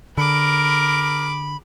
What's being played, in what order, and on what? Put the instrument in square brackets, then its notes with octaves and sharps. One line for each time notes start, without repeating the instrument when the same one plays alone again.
[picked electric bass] D3 [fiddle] G#4 D6 [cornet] A#4 [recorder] B5